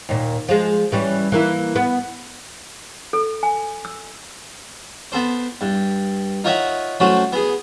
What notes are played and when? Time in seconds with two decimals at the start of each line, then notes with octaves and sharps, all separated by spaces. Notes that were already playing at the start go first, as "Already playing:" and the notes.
0.09 D#2 A#2
0.49 F3 G#3
0.92 E3 G3 C#4
1.32 E3 A#3 E4
1.76 B3
3.13 A4
3.43 G#5
3.85 E6
5.12 B3 A4 C5
5.61 G2
6.44 D#4 F4 A#4 C#5 E5 F#5
7.00 F#3 A3 C#4 F#4 C5
7.33 B3 G#4